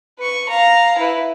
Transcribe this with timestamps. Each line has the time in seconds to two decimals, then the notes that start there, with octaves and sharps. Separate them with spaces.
0.18 B4 C#6
0.49 F5 A#5
0.98 E4 B4